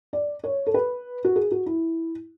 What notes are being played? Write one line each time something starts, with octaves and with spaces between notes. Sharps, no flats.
D5
C#5
A4
B4
F#4
G#4
F#4
E4